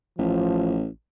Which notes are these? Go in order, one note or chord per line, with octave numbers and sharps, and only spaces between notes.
A1 F3